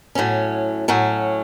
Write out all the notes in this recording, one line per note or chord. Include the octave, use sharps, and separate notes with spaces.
A2 F#3 C#4
A2 F#3 C#4